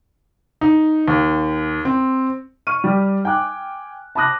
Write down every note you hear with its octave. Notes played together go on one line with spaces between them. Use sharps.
D#4
D#2
C4
C#6 F6 D#7
G3 G4
G5 G#5 D6 F#6
A5 B5 D6 D#6 F#6 A#6